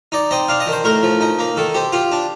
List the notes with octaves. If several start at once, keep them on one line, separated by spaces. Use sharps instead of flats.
D#4 D5
C4 D#5
D4 F5
D#5
D#3
C5
A2 A#4
F3
D#4
A#3
D#3 A4
C4 G4
F4 G4
D4